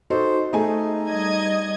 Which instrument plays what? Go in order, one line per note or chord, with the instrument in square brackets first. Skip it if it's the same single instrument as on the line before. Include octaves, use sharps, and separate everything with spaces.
[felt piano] D#4 F#4 A4 [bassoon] C5
[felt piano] A3 G#4 G#5 [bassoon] D#4
[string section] G3 D#5 G#6